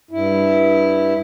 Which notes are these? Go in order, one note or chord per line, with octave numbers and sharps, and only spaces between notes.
G2 E4